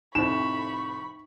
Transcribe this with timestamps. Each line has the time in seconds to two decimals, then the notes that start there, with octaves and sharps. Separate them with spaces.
0.15 F2 A2 C3 D#4 C5 B5 C#6 E7